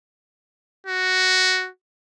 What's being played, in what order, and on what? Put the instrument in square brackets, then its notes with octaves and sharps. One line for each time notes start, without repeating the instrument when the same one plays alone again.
[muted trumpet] F#4